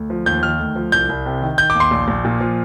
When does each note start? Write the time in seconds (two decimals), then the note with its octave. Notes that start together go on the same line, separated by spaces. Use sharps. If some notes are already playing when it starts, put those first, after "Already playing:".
Already playing: D2
0.10 F3
0.26 D#2 G6
0.43 D#3 F6
0.59 D2
0.76 F3
0.92 C2 G6
1.09 C2
1.26 C3
1.42 D#3
1.58 D#3 G6
1.70 D6
1.75 D#2
1.80 C6
1.91 A#1
2.08 A#1
2.25 A#2
2.41 F3